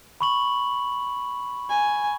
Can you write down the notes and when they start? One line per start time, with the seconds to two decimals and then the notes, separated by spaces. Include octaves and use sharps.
0.21 B5 C#6 F#7
1.69 G#5